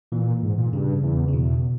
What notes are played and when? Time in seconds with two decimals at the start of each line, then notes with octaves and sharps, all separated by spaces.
0.12 A#2 E3
0.43 G#2
0.58 A#2
0.73 G2 C#3
1.03 E2
1.28 C#3
1.33 E2 B2